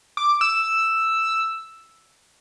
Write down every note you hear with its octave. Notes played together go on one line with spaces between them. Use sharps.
D6
E6